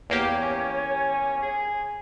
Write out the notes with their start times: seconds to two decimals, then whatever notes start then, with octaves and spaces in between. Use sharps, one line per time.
0.10 E2 A#3 G4 C#5
0.42 C#4
1.43 G#4